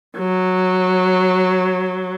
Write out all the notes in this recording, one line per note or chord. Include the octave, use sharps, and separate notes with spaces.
F#3